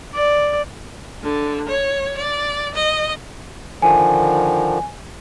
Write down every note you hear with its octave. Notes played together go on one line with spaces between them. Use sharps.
D5
D3
C#5
D5
D#5
D3 D#3 F3 G#5